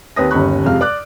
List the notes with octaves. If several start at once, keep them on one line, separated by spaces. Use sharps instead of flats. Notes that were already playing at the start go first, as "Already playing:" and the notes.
D#2 C4 B4 C#5 D#6 A#6
G1 D#2 C#4 B5 C#6 F#6
F2 C3 G#3 F5 F6
D5 D6 F#6